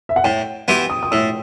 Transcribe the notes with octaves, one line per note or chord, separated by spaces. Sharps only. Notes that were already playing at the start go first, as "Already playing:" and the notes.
E5
F#5
A2 G5
E3 B3 E4 G4 C6
D#6
D#6
A2 E6